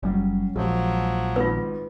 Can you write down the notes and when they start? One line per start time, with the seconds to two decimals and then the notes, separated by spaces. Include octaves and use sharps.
0.03 F#1 F#3 G3 C#4
0.56 A#1 F3 F#3 G#3
1.36 G#1 G#2 F4 B4